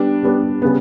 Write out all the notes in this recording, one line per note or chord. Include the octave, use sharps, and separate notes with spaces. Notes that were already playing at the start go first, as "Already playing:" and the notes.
Already playing: G3 B3 D4 G4
G3 B3 D4 G4
C#3 G3 B3